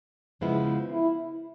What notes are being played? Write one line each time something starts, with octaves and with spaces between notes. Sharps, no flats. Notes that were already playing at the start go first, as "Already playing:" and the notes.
C#3 F3 G#3 B3 E4
E4